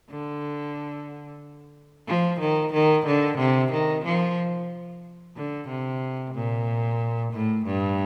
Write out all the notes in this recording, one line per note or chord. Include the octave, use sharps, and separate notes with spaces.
D3
F3
D#3
D#3
D3
C3
D#3
F3
D3
C3
A#2
A2
G2